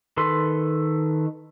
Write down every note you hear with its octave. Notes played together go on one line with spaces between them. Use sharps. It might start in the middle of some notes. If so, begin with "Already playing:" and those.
D#3 A4 B4 C6